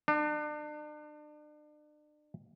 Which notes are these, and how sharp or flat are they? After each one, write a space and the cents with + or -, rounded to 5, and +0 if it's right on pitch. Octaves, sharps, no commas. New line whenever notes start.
D4 +35